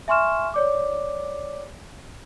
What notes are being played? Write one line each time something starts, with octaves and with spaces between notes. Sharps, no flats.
E5 G#5 C6 C#6 F6 E7
C#5 D5 D6